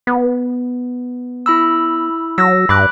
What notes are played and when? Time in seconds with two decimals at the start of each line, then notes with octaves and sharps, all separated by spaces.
0.07 B3
1.46 E4 B5 E6
2.38 F#3 E6 A#6
2.69 G2 B5 D6 F#6